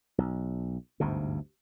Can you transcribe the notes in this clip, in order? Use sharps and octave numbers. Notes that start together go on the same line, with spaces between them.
B1
G1 D2 G#2 C3